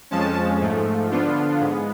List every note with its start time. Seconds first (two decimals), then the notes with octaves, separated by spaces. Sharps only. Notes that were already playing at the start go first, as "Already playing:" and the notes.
0.11 F2 F3 G#3 C#4 A5
0.61 G#2 F3 A3
1.11 D3 F3 B3 D4 F4
1.60 G#2 G#3 B3